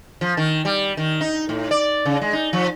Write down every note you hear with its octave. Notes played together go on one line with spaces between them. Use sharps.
F3
D#3
G3
D#3
D#4
A2
D5
C#3
G#3
D#4
F3